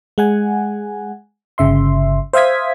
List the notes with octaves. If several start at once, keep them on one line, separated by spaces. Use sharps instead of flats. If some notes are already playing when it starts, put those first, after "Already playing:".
G#3 F#5 G#5
G1 C#3 E5 C6
C5 E5 F5 D#6 G#6 B6